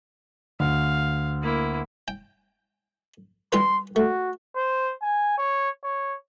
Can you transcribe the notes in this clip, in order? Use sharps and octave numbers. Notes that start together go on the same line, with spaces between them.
D2 F5
A#3 E4
G5
G3 F4 B4 C6
A3 F#4
C5
G#5
C#5
C#5